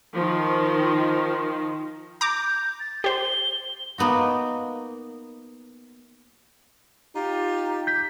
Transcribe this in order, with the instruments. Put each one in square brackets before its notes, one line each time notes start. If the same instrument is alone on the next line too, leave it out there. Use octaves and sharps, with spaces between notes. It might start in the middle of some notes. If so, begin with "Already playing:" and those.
[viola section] D#3 F3
[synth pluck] A#5 D6 [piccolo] G6
[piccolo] A6
[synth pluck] G4 C5 [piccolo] G7
[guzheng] A#3 B3 D#4 F#4
[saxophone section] D#4 F4 G4
[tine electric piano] G6 B6